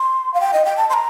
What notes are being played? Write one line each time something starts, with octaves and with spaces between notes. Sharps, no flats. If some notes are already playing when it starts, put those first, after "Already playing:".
Already playing: C6
F5
G5
D#5
G5
A5
C6
A#5